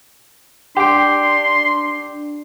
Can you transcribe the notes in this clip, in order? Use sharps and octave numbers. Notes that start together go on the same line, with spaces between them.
D4 G4 G5 C6